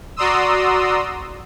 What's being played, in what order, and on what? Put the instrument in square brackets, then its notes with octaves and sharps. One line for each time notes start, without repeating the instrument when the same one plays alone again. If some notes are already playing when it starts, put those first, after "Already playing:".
[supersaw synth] F#4 D5 A#5 C6 D#6 E6